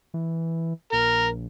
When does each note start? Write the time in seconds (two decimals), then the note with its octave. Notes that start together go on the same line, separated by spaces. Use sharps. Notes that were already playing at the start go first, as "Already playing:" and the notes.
0.14 E3
0.93 A#1 A#4